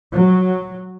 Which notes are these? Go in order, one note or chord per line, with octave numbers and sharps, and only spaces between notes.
F#3